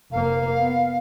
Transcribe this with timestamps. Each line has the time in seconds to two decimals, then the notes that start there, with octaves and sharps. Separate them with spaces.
0.12 F1 A#3 F5
0.59 B3